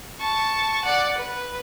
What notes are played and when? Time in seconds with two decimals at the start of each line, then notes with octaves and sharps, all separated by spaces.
0.20 A5 C#6
0.85 D5 F#5
1.17 B4